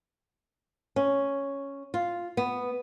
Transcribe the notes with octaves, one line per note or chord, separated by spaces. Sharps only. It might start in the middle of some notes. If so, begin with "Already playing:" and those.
C#4
F4
B3